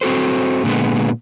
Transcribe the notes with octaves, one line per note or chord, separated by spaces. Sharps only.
C4 F#4 A4 C5
A#2 D3 G#3 B3